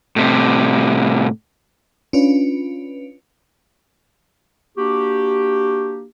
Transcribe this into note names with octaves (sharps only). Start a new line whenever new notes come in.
A2 C3
C#4 D4 F4 B4
A#3 D4 F#4 G4